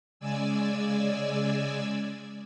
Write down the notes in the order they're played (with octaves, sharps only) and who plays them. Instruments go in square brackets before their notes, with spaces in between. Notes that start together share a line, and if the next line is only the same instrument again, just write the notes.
[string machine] C#3 G#3 D5 G#5 E6